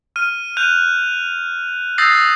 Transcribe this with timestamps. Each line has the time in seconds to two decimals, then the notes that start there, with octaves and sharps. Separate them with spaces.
0.16 F6 D#7
0.57 F#6 G6 D#7 F7
1.98 D#6 E6 G6 A6 A#6 C7